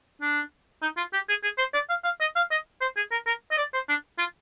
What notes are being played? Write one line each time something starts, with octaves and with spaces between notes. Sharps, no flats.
D4
D#4
F4
G4
G#4
G#4
C5
D5
F5
F5
D#5
F5
D#5
C5
G#4
A#4
A#4
D#5
D5
C5
D4
F4